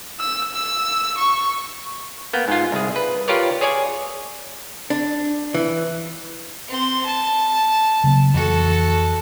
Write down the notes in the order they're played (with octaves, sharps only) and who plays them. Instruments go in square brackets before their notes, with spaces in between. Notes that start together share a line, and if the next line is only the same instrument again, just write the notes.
[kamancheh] E6
E6
C#6
[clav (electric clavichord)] A#3 B3 G5
G#2 F4
C2 G#4
B4
F4 G4 A#4 B4 C#5 D5
G#4 C#5 D5 G#5
[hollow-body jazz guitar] D4
E3
[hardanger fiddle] C4 C6
A5
[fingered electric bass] C#3 F#3 A#3
[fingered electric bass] F2 E3 [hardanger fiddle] F#4 A4